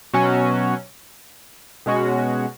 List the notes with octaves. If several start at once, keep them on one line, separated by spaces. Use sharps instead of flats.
B2 F#3 C#4 F#4
B2 G#3 C#4 F#4